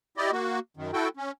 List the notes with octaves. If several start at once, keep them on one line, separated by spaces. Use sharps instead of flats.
E4 G4 D5 D#5
A#3 F#4
F#2 D#3
E4 F#4 A4 G5
C#4